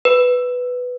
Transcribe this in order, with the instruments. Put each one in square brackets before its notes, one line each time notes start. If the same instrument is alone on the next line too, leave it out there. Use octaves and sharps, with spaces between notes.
[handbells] B4